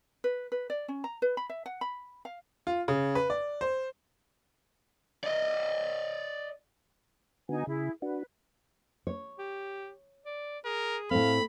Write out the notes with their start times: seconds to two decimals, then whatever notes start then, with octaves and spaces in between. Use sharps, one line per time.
0.24 B4
0.52 B4
0.70 D5
0.88 C#4
1.04 A#5
1.22 B4
1.37 B5
1.50 E5
1.66 F#5
1.81 B5
2.25 F5
2.67 F4
2.88 C#3
3.15 B4
3.30 D5
3.61 C5
5.24 D5 D#5
7.49 D3 B3 D#4 F#4 G#5
7.67 C#3 E4 G#4
8.02 D4 F#4 B4
9.07 C#5
9.39 G4
10.26 D5
10.65 G#4 A#4
11.11 A2 C4 A4 F5 B5